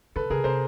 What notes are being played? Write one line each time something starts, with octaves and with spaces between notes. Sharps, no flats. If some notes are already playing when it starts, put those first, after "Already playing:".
D3 A4 B4
C#3 G#4 A#4
C3 A#4 C5